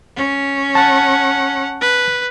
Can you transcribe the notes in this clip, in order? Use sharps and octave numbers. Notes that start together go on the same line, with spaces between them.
C#4
F#5 A5
B4